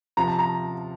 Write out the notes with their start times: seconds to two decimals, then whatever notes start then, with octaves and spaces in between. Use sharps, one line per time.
0.17 C3 F3 A#5
0.28 A5
0.39 A#5